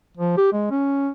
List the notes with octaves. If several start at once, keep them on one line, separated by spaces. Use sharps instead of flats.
F3
G4
G#3
C#4